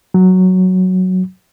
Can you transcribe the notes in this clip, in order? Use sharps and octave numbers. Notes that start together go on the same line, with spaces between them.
F#3